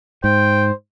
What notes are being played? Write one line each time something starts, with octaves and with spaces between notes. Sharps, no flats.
G#2 C5 G5